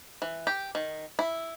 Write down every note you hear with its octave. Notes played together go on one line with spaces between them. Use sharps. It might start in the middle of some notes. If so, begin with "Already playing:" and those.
E3
G4
D#3
E4